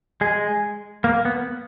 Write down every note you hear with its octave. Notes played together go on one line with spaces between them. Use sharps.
G#3 G#4
A#3
B3